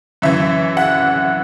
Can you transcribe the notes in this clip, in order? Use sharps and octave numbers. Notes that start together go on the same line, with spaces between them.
F#2 E3 E5
F#5